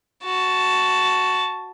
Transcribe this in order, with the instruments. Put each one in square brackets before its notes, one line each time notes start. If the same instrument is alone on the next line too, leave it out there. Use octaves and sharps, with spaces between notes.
[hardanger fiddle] F#4 A5